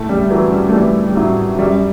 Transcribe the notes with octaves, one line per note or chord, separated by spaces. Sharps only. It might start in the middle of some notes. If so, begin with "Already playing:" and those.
Already playing: A2 A3
G3
E3 F#3
G3
A3
E3 G3
G3
A2 F#3
F#3
F#2 G3